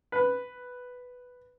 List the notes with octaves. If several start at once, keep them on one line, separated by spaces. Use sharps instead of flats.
B4